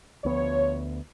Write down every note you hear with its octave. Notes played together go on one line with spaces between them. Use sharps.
D2 F3 B3 C#5